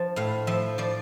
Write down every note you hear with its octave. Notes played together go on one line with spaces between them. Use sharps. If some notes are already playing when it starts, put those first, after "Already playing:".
Already playing: F3 A5
A2 F5
F3 E5
F3 D5